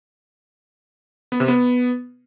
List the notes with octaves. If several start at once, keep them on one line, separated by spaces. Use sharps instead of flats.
B3
C3
B3